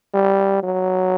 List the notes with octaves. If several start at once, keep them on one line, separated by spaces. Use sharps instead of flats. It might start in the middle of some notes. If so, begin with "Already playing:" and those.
G3
F#3